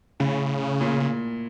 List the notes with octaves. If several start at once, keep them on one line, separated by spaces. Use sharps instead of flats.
A2 C#3
A#2